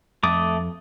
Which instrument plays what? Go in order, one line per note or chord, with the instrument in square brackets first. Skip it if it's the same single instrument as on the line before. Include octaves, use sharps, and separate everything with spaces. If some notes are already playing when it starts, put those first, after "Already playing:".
[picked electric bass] F2 [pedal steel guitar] A3 D6 D#6